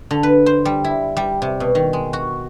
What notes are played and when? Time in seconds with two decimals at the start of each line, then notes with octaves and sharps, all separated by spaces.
0.11 D3
0.23 B4
0.46 C5
0.65 G3
0.84 E4
1.17 G3
1.42 C3
1.60 B2
1.75 D#3
1.93 G#3
2.13 F#4